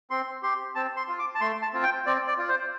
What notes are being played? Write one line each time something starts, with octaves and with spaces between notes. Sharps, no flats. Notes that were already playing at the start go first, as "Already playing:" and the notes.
C4 C6
G4 C6
C4 A5
C6
F4
D6
A5
A3 C6
A5
C4 F4
G5
C4 D5
D5
F4
C5